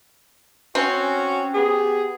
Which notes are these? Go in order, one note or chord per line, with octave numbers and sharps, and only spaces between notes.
C4 C#4 F#4
B3 G4 G#4